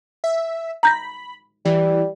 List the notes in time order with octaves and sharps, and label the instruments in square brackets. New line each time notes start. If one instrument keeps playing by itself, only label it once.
[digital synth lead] E5
[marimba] A#5 G6 A#6 [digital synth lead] B5
[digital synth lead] E3 [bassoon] G3